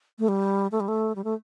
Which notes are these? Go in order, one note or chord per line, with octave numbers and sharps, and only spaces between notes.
A3
G3
A3
G3
A3
G3
A3